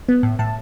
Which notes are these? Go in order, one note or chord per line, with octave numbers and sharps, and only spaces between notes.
B3
A2
A2 A5